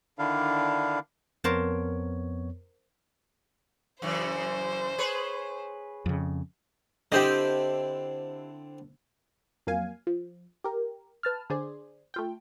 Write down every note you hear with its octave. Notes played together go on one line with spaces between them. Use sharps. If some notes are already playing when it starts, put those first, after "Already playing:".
D3 D#3 D4 E4 F5
F2 B3 A#4 C5 C#5 A5
F#2 C#3 E3 C5
G#4 B4 C#5
F2 C#3
D3 C4 E4 G4 C5 D#5
F2 F#3 A#3 F5 G#5
F3
G4 A#4
B4 A5 F6
D3 G#4 C5 D5
A3 F4 G5